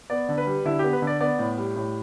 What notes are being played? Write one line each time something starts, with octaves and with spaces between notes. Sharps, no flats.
B3 D5
D3
B4
G3
D3 E4
B3 G4
B4
D3
D5
B3 D5
A2
G3
A2